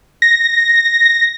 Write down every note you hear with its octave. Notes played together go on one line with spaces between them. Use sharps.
A#6